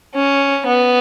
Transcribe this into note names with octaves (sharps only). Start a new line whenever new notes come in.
C#4
B3